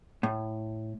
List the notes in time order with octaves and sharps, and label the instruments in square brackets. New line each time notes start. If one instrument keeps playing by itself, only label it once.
[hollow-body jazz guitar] A2